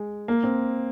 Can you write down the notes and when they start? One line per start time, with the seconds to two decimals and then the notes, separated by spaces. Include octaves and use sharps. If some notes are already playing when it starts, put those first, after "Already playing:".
Already playing: G#3
0.28 A#3
0.43 C4